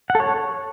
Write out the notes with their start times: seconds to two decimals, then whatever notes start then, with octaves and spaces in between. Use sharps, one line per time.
0.10 F#5
0.15 A4
0.20 C#5